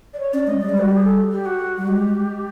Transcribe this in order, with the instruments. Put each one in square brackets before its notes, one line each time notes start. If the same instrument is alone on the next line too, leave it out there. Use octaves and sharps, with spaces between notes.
[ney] D5
C#5
[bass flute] C#4 [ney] D5
[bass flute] G#3 [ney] D#5
[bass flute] G3 [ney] D5
[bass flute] G#3
[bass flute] G3 [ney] F#4
[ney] G4
G#4
A4
G4
F#4
[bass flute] G3
[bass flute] G#3 [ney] G4